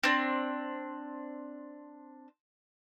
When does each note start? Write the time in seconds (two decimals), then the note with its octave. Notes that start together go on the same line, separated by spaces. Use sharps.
0.04 C4 D4